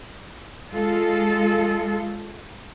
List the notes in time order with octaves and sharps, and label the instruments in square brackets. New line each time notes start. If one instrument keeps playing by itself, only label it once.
[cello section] G#3 F4 A4